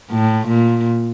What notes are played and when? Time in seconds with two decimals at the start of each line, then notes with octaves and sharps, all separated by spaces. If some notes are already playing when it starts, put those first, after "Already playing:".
0.11 A2
0.47 A#2